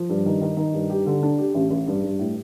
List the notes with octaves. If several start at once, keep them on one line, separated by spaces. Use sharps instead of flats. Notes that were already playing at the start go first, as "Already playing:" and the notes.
Already playing: F3
G2
D#3
D#3
D#3
G2
G4
D3
D4
G4
A1
A1
G2
G2
A2